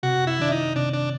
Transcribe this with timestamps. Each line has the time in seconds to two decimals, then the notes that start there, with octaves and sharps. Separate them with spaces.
0.03 C3 F#4
0.27 E4
0.39 D#3 D4
0.52 D#4
0.76 C3 D4
0.93 D4